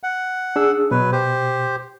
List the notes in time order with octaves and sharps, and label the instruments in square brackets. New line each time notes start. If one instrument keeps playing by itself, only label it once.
[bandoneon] F#5
[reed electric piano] D4 G#4 E6
[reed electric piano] B2 [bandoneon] F#3 B4
[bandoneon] G4 C5